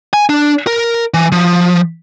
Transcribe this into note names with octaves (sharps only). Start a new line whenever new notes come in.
G#5
D4
A#4
E3
F3